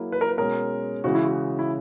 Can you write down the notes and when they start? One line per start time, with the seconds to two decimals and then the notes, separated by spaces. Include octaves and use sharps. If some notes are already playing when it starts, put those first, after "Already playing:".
Already playing: F#3 A#3 E4 G#4
0.12 B4
0.21 A#4
0.29 B4
0.37 B2 G#3 C#4 G#4 A#4
1.04 C#3 E3 G#3 F#4
1.15 E4
1.24 F#4
1.59 E4